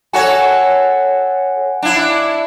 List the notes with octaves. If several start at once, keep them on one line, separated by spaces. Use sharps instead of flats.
F#4 A4 C#5 F#5 G#5
D4 E4